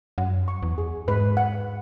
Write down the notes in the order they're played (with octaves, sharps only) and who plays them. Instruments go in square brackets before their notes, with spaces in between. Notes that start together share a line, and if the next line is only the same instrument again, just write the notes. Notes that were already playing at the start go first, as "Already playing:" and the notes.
[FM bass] F#2 [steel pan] F#5
[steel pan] C#6
[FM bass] E2
[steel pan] G#4
[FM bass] G#2 [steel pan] B4
[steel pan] F#5